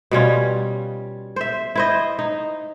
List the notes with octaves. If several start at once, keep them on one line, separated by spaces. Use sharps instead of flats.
B2 G3 C#4 F4
C5 E5
E4 C5 D#5
D#4